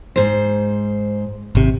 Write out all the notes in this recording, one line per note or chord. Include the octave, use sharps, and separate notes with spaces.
G#2 C5
G#1 C3